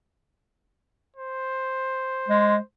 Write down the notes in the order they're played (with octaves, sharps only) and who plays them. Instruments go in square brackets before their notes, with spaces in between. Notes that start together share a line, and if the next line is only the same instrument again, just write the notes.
[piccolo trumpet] C5
[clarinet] G#3